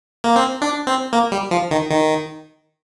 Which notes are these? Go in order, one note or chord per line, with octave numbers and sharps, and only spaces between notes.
A#3
C4
D4
C4
A#3
G3
F3
D#3
D#3